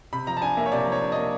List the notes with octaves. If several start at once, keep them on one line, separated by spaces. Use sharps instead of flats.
C3 B5
F3 A#5
A5
D4 G#5
A#3 E5
C#5
C3 D5
F3 C#5
D4
A#3 D#5